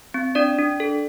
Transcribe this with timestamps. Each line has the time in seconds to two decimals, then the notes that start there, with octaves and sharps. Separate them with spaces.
0.14 C4
0.35 D4 D5
0.58 D4
0.80 A4